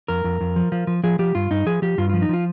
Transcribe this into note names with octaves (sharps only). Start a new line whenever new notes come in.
F2 A#4
F2
F2
F3
F3
F3
F3 G#4
F3 G4
G2 F4
G2 D#4
F3 G#4
F3 G4
G2 F4
F3 F4
D#4
F3 F4